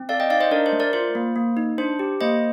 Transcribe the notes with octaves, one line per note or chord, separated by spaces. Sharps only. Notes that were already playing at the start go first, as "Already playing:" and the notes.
Already playing: C4
A4 D5 F5
D#5 G5
D#4 D5 F5
C5 D#5
D4 A#4 D5
C5
A3
A#4 D5
F4 C5
A#3
A#3
D#4
D4 C5
G4
A#3 C5 D#5